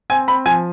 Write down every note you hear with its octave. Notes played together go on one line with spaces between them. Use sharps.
C4 G#5
C4 B5
F3 G#5